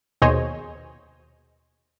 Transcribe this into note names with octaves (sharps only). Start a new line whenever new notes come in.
D#2 B2 G#4 C5 C#5 D#5